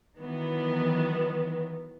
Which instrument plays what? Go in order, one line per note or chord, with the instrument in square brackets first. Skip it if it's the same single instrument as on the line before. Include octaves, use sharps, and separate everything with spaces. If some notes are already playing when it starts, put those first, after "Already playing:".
[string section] D#3 E3 F#3 B3